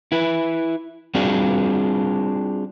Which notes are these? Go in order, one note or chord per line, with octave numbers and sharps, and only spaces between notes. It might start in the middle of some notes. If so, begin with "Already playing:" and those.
E4 B4
G3 C4 D4 F4 F#4 G#4